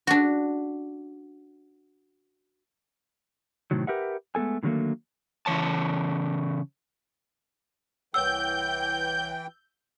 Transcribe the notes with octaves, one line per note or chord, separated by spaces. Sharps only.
D4 F#4
A2 C3 D#3 F#3
G4 A#4 B4 E5 F#5
G#3 A3 B3 A4 G#5
A2 D3 D#3 F#3 A3 A#3
C#3 E3 C#5 A5
C2 E3 C#5 F#5 G5 E6 G6